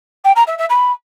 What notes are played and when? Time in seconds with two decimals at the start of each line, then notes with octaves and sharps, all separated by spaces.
0.24 G5
0.36 A#5
0.47 E5
0.58 E5
0.69 B5